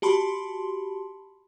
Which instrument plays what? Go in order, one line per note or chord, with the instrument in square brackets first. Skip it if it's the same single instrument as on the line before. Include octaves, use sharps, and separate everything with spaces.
[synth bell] F#4 G4 A5 B5 C6